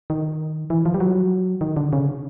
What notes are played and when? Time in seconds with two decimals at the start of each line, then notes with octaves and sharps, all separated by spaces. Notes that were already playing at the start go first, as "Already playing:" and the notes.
0.10 D#3
0.70 E3
0.86 F3
0.94 G3
1.00 F#3
1.61 D#3
1.77 D3
1.93 C#3